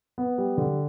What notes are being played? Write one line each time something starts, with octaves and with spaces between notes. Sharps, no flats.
B3
G3
D3